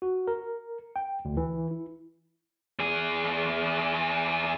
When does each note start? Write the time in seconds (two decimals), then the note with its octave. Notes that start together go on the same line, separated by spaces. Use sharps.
0.02 F#4
0.27 A#4
0.96 G5
1.25 D2
1.37 E3
1.71 E4
2.79 E2 G#4